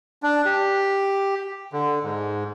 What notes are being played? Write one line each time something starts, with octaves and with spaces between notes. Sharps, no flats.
D4
G4
D3
G#2